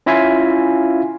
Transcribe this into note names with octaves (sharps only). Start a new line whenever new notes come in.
C#4 E4 F4 E5 F5 G#5